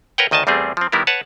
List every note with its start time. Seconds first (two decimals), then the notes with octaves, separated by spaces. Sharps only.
0.18 A#4 B4 C#5 F#5 G5
0.31 D2 D#3 D#5 G#5 A5
0.47 E2 G3 A3 C4 G#4
0.77 F3 C4
0.92 D#3 G3 B3 E4 G4 A#4
1.07 B4 C#5 F#5 A5